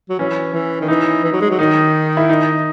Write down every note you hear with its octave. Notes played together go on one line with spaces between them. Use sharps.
F#3
E3 C#4
E3
D#3
E3 D#4
E3
F#3
G#3
F#3
D#3 D#4
E4
D#4